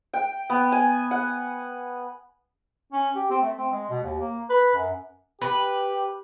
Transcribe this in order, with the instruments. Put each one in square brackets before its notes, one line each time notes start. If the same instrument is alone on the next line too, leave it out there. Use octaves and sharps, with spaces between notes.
[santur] G5
B3
G#5
F#5
[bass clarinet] C#4
G4
C4
A3
C4
G#3
B2
D#2
A#3
B4
F#2
[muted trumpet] G4 [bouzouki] B4